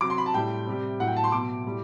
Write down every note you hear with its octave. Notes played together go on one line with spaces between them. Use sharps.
C3 F#3 D6
C6
B5
A5
A2 G3 G5
C3 G3
A2 F#3 F#5
G5
A5
C6
B2 F#3 D6
A2 G3